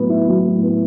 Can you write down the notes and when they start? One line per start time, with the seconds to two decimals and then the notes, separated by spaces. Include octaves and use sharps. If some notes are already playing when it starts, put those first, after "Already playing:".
Already playing: A2 F#3 B3
0.09 E4
0.27 F#3
0.45 A2
0.62 B3